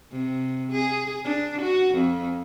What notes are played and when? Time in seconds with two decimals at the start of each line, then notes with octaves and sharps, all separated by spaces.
0.11 C3
0.72 G#4
1.24 D4
1.62 F#4
1.94 F2